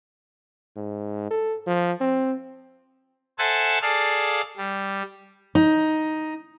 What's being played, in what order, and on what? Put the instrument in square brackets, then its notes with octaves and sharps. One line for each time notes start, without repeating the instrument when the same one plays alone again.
[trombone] G#2
A4
F3
C4
[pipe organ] A4 C5 E5 F#5 G#5 A5
G#4 A4 D5 F5 F6
G3
[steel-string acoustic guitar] D#4